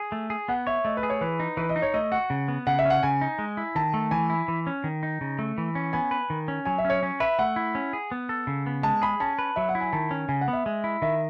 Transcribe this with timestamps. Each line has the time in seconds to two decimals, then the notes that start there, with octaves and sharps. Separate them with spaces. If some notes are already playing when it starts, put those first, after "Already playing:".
Already playing: G#4
0.12 A3
0.30 G#4
0.48 B3 F#5
0.67 C#5 E5
0.85 A3 D#5
0.97 B4
1.03 G#4
1.10 C#5
1.21 E3 B4
1.40 D#4
1.57 E3 B4
1.69 D#5
1.76 D#4
1.82 C#5
1.94 A3 D#5
2.12 F#4 F#5
2.30 C#3
2.48 B3
2.67 C#3 F#5
2.79 E5
2.85 C#4 F#5
3.03 C#3 G#5
3.21 D#4
3.39 G#3
3.57 E4
3.75 D#3 A5
3.94 A3
4.11 E3 G#5
4.30 E4
4.48 E3
4.67 C#4
4.84 D#3
5.03 D#4
5.21 C#3
5.39 A3
5.58 E3
5.75 C#4
5.93 B3 G#5
6.11 B4
6.30 D#3
6.48 C#4
6.65 F#3 G#5
6.78 E5
6.85 C#4
6.90 C#5
7.03 C#4
7.20 B4 E5
7.39 A3 F#5
7.56 E4
7.75 C#4
7.93 G#4
8.12 B3
8.29 A4
8.47 C#3
8.66 B3
8.83 G#3 A5
9.02 G#4 B5
9.20 C#4 A5
9.39 B4
9.56 F#3 E5
9.69 F#5
9.75 E4
9.81 G#5
9.93 D#3 A5
10.11 C#4
10.29 C#3 G#5
10.41 F#5
10.48 B3
10.53 E5
10.66 G#3
10.84 E4
11.02 D#3 E5